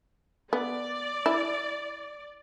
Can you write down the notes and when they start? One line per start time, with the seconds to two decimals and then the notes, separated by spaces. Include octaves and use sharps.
0.53 B3 D5
1.26 E4